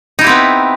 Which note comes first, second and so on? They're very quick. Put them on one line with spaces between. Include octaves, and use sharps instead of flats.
D#4 E4 G4 C4 B3